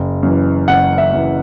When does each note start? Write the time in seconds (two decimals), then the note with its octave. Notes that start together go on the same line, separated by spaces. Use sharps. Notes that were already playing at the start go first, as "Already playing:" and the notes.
Already playing: F#1
0.23 F#2 E3
0.68 F#1 F#5
0.98 E5
1.13 F#2 E3